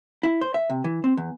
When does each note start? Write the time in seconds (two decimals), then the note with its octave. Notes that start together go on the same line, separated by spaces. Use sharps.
0.23 E4
0.41 C5
0.54 E5
0.70 C3
0.84 E3
1.04 C4
1.17 E2